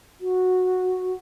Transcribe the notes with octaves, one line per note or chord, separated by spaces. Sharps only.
F#4